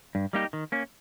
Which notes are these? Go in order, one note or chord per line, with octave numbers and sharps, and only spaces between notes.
G2
G3 A#3 D#4 G4
D#3
A#3 C#4